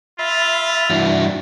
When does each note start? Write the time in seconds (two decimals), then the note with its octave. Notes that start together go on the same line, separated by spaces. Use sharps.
0.19 F4 E5 B5
0.90 G2 E3 D4 E4 F#4